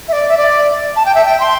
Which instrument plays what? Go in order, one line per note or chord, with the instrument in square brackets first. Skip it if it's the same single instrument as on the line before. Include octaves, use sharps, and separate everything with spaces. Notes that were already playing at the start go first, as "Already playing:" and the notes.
[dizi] E5
D5
E5
D5
A5
G5
E5
G5
C6